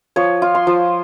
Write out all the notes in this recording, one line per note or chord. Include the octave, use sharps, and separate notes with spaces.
F3 C#5
F4
C6
F3